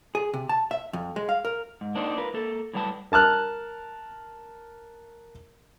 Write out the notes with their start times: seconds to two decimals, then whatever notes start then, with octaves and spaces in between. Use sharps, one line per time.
0.15 G#4
0.34 C3
0.49 A5
0.71 E5
0.93 F2
1.16 G#3
1.29 F5
1.45 A#4
1.81 G#2
1.95 A#3 D4 D#4 C5
2.17 F4 A#4 B4
2.34 A#3 A4
2.74 A2 F#3 G3 B4 A5
3.12 A#4 A5 F6 F#6